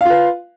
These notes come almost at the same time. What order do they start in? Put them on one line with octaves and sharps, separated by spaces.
F5 F4 B4